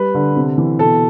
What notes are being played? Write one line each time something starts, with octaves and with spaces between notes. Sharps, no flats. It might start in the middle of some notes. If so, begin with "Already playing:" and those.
Already playing: G3 B4
D3
C3
E3
B2 A4